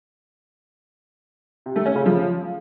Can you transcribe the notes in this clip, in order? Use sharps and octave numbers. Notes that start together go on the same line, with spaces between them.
C3
A3
C#4
C#3
F3